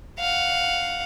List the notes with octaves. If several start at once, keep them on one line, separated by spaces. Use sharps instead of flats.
F5 F#5